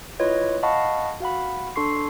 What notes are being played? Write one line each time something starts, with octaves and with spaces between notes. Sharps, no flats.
E4 F4 B4 C#5 D#5
D#5 F5 F#5 A5 B5 C#6
F#4 F5 F#5 B5
D4 A4 C6 C#6 C7